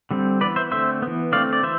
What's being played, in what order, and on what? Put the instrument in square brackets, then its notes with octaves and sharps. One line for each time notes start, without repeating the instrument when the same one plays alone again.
[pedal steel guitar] D3 G3 C4
E3 B3 B4 D5
C5 E5
D3 A3 C4 C5 E5
E3 B3
D3 A3 C4 D5 F5
D5
E3 C5 E5